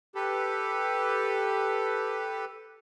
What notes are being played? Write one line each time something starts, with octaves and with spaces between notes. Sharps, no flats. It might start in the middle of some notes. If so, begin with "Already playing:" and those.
G4 A4 B4